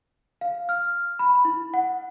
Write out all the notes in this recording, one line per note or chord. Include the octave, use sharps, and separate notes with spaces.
F5
F6
B5
E4
F#5